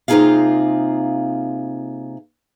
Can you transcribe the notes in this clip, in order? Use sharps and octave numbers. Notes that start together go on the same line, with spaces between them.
C3 A#3 D#4 F4 G#4 F5